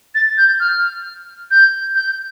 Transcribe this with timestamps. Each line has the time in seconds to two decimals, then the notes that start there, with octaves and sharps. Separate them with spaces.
0.15 A6
0.38 G6
0.60 F6
1.51 G6
1.95 G6